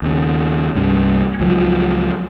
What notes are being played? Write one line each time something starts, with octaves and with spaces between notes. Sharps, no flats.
D#2 C#3
C2 G2 C#4
C#2 F3 F#3